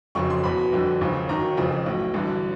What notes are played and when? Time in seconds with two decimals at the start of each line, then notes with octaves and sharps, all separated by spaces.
0.15 F1 F2 C#3 F#3 C#6
0.30 C6
0.43 E2 B2 F#3 B5
0.72 G1 F2 D3 F#3
1.01 E1 D#2 C#3 F3
1.29 D#2 D#3 F#3 A#5
1.57 F1 F2 C#3 F3
1.86 B1 A2 F#3
2.14 A1 G2 D3 F#3